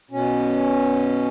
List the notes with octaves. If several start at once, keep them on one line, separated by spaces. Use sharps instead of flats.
B2 C#4